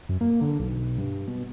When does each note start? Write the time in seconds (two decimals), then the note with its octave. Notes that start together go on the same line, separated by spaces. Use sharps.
0.09 F#2
0.21 A#3
0.41 D3
0.59 B1
0.98 G2
1.28 B2